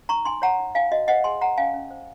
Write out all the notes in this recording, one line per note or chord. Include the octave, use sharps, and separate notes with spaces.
D#4 A#5 C#6
D#4 G#5 C6
C#5 F#5 A#5
D#4
D#4 F5 G#5
F#4 D#5
C5 D#5 F#5
G#4 G#5 C6
C5 F#5 A#5
C#4 F5 G#5
C#4
C5